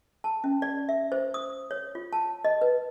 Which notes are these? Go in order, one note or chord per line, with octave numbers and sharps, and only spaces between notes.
A5
C#4
D5
E5
C5
D#6
C#5
F4
A5
D#5
B4